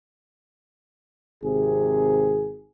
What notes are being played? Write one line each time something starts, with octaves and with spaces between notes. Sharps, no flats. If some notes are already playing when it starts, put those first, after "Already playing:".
G#1 C3 G#4